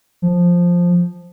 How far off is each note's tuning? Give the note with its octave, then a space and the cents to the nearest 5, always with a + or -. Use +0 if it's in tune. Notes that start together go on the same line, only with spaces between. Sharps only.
F3 +5